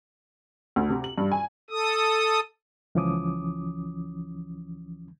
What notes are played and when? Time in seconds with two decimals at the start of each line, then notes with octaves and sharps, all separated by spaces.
0.76 D2
0.89 C3
1.04 F#7
1.18 G2
1.32 G#5
1.70 A4 D#6
2.95 C#2 E3 F3 C#4 D6 D#6